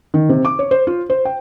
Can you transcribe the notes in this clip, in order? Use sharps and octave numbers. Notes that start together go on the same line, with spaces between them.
D#3
C3
D6
C#5
C5
F4
C5
G5